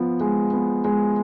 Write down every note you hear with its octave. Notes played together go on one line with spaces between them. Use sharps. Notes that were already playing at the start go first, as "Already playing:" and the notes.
Already playing: F3 B3
G#3
B3
G#3